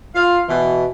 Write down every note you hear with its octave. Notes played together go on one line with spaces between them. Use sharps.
F4 F5
B2 E3